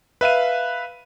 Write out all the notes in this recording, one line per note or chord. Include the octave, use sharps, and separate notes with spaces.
B4 E5 F5 D#7